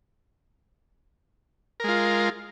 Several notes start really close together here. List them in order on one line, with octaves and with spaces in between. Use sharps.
A#4 G#3 F4